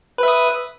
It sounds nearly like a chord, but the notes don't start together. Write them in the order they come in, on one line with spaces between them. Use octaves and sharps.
B4 E5 D#6